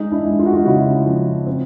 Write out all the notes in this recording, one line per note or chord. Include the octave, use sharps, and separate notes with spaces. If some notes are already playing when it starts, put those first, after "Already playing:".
Already playing: G#3 D#4
D4 E4
G#3
F4
F#4
D#4 F4
C#3 E4 F#4
F3
C4